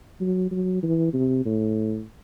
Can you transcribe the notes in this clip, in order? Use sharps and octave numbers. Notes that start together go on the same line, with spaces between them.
F#3
F#3
E3
C3
A2